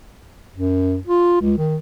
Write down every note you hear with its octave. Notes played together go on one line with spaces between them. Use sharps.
F#2
F4
C#2
D#3